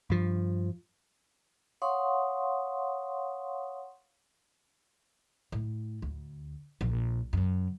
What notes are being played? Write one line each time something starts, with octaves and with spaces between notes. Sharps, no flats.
G2 F3
C#5 F5 F#5 C6 C#6 D#6
A2
D2
A#1
F#2 C#3